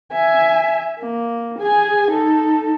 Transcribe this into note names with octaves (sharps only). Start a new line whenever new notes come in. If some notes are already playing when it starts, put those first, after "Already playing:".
E5 G#5
A#3
G#4 G#5
D#4 A4